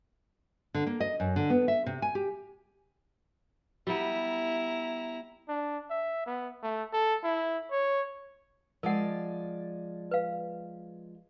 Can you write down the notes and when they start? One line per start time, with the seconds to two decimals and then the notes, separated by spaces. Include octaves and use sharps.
0.74 D3
0.87 A#3
1.00 D#5
1.20 F#2
1.36 D3
1.50 B3
1.68 E5
1.86 C3
2.02 G#5
2.15 G4
3.87 G3 B3 E4 A#5
5.48 D4
5.90 E5
6.26 B3
6.63 A3
6.93 A4
7.24 E4
7.71 C#5
8.83 F3 G#3 A#4 D5 F#5
10.11 B4 F5